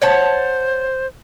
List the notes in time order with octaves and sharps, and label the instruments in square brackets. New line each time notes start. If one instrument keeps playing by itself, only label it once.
[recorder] C5 [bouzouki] C#5 F#5 A5